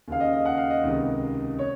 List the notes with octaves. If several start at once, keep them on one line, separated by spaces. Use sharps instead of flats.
D#2 C#3 F5
D#5
D#5
F#5
F5
D#5
C#2 C3 D#3
C#5